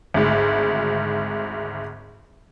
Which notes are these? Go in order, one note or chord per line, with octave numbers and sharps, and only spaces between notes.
G#1 D2 G#2